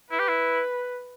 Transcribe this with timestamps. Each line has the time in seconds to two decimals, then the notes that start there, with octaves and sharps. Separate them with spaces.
0.11 E4 B4
0.19 G4
0.28 E4